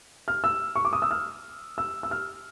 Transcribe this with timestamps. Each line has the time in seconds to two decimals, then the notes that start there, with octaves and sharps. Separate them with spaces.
0.28 F6
0.44 E6
0.76 C#6
0.85 D6
0.93 D#6
1.02 E6
1.11 F6
1.78 E6
2.03 E6
2.11 F6